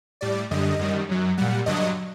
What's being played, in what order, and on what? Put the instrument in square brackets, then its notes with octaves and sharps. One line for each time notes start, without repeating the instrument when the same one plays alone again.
[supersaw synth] A2 G3 D5
F#2 D3 G3 D#5
F#2 D#3 G3
F#2 F#3
A#2 G3 F#5
G2 D3 F#3 D#5